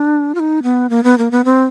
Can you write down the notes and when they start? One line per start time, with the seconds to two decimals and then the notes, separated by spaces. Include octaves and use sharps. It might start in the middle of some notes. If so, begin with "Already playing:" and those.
Already playing: D4
0.35 F4
0.40 D#4
0.63 B3
0.90 A#3
1.04 B3
1.18 A#3
1.31 B3
1.45 C4